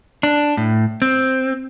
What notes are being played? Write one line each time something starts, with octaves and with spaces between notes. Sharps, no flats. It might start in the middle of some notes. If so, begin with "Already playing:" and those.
D4
A2
C4